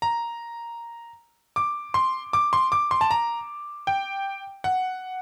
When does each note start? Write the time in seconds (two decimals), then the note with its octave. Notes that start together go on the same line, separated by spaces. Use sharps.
0.02 A#5
1.56 D6
1.94 C6
2.33 D6
2.53 C6
2.72 D6
2.91 C6
3.01 A5
3.11 A#5
3.87 G5
4.64 F#5